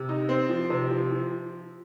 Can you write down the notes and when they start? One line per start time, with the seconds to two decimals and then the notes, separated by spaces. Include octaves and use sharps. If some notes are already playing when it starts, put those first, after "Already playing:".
Already playing: C3
0.09 D#4
0.29 C4
0.50 F3
0.70 C3
0.91 F3
1.11 F3